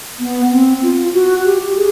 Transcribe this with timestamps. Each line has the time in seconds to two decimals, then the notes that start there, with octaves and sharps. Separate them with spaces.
0.20 B3
0.51 C4
0.83 F4
1.14 F#4
1.45 G4
1.76 G#4